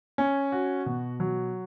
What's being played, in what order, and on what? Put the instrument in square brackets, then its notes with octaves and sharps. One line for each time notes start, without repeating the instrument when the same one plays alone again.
[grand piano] C#4
F#4
B2
F#3